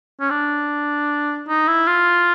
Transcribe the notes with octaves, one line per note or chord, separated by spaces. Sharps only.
C#4
D4
D#4
E4
F4